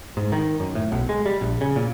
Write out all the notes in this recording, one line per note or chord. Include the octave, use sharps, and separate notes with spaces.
G#2
D#3
F#2
A2
B1
G#3
G3
A#1
C#3
A#2